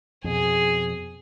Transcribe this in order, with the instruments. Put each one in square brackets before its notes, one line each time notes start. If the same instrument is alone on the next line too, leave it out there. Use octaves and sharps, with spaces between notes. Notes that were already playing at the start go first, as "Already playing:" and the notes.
[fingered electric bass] F2 B2 [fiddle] G#4